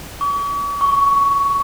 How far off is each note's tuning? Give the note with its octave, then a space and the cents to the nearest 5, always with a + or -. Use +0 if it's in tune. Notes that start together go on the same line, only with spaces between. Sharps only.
C#6 +45
C#6 +10